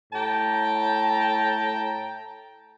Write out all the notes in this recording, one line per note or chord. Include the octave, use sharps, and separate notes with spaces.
A2 G5 A5 A#5